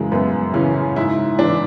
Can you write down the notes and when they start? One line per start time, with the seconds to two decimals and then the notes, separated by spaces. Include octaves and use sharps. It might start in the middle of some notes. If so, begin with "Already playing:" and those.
Already playing: F#2 C#3 E3 F#3 G#3
0.12 F#2 B3
0.54 C#3 E3 C#4
0.96 G#2 E4
1.39 E3 D4